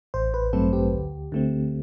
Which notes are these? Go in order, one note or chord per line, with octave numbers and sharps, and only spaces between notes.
A1 C5
B4
G2 F#3 A3 C4 A4
G4
D2
D3 A3 C4